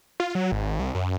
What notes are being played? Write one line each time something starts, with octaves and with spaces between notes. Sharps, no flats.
F4
F#3
G#1
C2
F#2